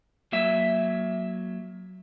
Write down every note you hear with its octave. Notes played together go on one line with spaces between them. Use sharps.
F#3 A#3 E5